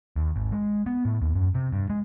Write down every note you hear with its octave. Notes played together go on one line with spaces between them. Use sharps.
D#2
G#1
G#3
B3
A2
D#2
F#2
C3
G2
G#3